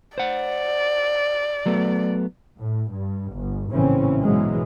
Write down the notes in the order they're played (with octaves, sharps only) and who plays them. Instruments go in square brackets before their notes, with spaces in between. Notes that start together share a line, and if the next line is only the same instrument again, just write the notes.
[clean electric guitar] C5 F#5 [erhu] D5
[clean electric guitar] F#3 A3 B3
[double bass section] A2
G2
G1
A#1 A2 C#3 E3 C4 C#4
G#2 B2 E3 F#3 G#3